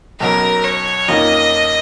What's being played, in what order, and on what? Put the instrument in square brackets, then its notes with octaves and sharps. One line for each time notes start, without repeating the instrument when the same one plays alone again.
[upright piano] B1 B2 F#3 C#4 [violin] A#4
[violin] C#5
[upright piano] F2 D#3 A#3 C#4 F4 [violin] D#5